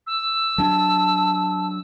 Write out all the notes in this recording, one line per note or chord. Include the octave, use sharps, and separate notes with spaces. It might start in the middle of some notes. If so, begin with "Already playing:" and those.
E6
F#3 D4 A5